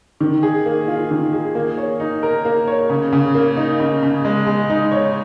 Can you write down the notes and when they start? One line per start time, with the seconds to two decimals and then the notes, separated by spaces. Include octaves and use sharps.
0.20 D#3
0.43 G#4
0.66 A#3
0.88 F4
1.11 D#3
1.33 G#4
1.55 A#3
1.78 C#5
2.00 D#4
2.23 A#4
2.45 A#3
2.68 C#5
2.90 C#3
3.12 C#3
3.35 A#3
3.57 D#4
3.80 C#3
4.02 C#3
4.25 G#3
4.47 G#3
4.70 D#4
4.92 C#5